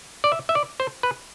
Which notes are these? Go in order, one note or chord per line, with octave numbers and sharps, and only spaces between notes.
D5
E5
E5
D5
C5
B4